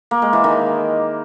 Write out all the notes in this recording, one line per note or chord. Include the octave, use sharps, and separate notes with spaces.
A#3
G#3
E3
D#3